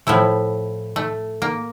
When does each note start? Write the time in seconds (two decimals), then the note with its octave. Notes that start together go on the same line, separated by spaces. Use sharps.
0.07 A2 F3 A3 E4
0.96 A3
1.42 A#3